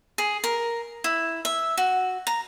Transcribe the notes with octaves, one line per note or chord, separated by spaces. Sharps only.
G#4
A#4
E4
E5
F#4
A#5